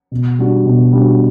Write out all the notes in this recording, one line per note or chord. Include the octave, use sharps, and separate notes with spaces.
B2
G3 D4 F#4
B2
G3 D4 F#4